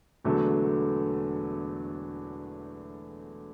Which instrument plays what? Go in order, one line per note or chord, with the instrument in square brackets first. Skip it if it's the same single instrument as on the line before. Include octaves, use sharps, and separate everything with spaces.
[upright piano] E1 E2 D3 F#3 A3